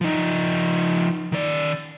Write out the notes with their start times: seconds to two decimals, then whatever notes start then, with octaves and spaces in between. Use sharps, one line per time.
0.01 F3 D#4
1.32 D#3 D5